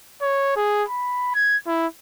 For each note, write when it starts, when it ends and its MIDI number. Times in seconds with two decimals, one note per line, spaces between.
0.22 0.52 73
0.56 0.83 68
0.88 1.31 83
1.35 1.57 92
1.67 1.87 64